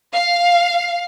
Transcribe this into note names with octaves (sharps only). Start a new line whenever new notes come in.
F5